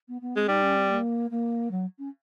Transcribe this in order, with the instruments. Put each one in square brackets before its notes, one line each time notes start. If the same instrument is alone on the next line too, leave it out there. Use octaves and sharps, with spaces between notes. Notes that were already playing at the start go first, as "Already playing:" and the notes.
[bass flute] B3
B3
[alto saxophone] G#3 [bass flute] C4
[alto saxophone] G3 [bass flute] D#4
[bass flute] C#4
C4
A#3
A#3
F#3
C#4